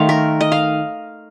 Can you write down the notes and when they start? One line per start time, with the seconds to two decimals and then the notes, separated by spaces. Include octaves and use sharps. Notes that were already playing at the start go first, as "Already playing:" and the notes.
Already playing: D#3 A3 C5 F5
0.09 A#4
0.41 D#5
0.52 F5